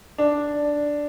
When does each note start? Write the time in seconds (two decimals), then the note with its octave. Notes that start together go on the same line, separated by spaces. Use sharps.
0.18 D4